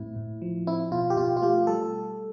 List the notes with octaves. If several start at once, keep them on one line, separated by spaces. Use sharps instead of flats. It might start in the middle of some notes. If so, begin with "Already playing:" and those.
Already playing: A2 C4 E4
A2
F3
C4 E4
B2 F4
G4
B2 F4
F4
A3 G4
G3 A4